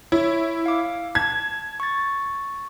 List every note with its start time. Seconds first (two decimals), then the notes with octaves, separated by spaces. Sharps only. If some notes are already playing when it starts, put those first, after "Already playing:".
0.12 E4 C#5
0.66 F5 D6
1.15 A5 G#6
1.80 C#6 A6